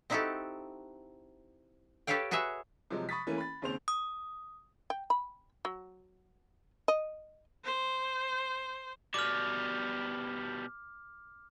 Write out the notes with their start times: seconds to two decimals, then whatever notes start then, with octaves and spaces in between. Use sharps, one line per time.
0.10 C4 D#4 E4 F#4 G4 A4
2.07 G4 A4 B4 C#5 F5 G5
2.31 F#4 G#4 B4 C#5 E5
2.91 C3 F3 F#3 G#3
3.09 B5 C#6 D#6 A6 B6
3.27 E3 A3 A#3 C#4 E4
3.38 B5 A6
3.62 D#2 C#3 C4 C5 F7
3.88 D#6
4.90 G5
5.10 B5
5.65 F#3
6.88 D#5
7.64 C5
9.14 B2 G3 D6 F6